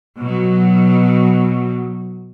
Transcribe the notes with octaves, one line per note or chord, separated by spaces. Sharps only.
B2 F#3